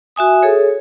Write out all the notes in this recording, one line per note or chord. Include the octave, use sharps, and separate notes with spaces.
F#4 E5 G#5 D#6
G#4 A4 C#5